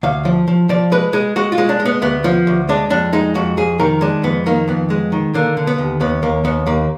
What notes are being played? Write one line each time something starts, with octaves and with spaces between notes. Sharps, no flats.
D2 F5
F3
F3
F3 D5
G#3 B4
G#3 G#4
G#3 F#4
F4
G#3
D4
G#3
B3
D2 B3
F3
D2
G#3 D4
F2 D4
G#3 D#4
F2 F#4
F2 G#4
D#3 A#4
G#3 D4
F2 B3
D#3 A#3
F2 B3
G#3
D#3
D3 A#3
D3
B3
D#2
D#2 B3
D#2 A#3
D#2 B3
D#2 A#3